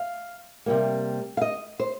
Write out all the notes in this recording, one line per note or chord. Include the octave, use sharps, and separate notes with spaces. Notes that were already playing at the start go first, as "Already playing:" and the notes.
Already playing: F5
C3 G3 A#3
F5
D#5
C5